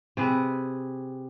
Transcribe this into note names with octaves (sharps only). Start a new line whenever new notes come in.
C3 G#4 B4